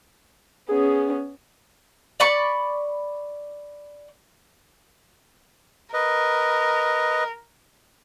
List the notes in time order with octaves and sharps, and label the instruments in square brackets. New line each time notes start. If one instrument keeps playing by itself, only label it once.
[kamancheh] B3 C#4 [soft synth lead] G#4
[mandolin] D5 B5 C#6
[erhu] A#4 [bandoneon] B4 D#5